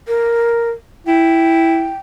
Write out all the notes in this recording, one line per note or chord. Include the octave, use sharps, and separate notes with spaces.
A#4
E4 G5